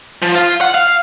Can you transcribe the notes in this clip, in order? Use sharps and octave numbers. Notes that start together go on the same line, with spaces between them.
F3
F4
F#5
F5